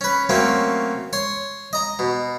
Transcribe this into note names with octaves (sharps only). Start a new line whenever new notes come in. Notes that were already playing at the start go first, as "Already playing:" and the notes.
C#4 B4
F#3 A3 A#3 C4 C#4
C#5 C6
D#5 A#5
B2